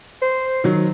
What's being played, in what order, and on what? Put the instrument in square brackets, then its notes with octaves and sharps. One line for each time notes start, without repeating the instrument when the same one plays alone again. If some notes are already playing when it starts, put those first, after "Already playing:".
[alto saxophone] C5
[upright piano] D#3 F#3